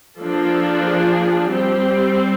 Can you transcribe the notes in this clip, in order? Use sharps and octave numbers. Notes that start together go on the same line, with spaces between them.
F3 A#3 D4 A4
G#4
G3 C4 G4